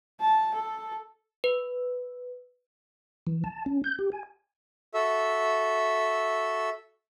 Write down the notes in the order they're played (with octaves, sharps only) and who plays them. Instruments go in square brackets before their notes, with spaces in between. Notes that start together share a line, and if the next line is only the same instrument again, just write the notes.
[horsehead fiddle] A5
A4
[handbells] B4
[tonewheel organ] E3
A5
C#4
G6
G4
G#5
[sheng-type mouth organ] F#4 A4 E5